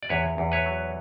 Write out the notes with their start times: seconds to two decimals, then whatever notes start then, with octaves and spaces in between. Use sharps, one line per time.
0.03 D5
0.09 E2 B4 C#5
0.38 E2
0.52 B4 C#5
0.66 F#3